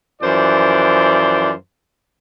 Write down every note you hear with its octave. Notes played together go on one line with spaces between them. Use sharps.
F#2 E3 F3 C5 D5